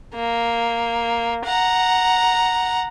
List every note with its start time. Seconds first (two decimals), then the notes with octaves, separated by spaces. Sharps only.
0.14 A#3
1.45 F#5 A#5